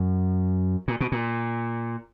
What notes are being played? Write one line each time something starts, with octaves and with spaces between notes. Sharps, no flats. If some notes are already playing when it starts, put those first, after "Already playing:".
Already playing: F#2
A#2
B2
A#2